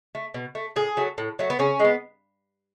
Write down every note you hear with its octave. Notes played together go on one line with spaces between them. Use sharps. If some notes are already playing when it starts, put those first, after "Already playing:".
A3
B2
A3
A2 G#4
F#3 A3
A2
F#3 A3
B3
C#3 C#4
G#3 B3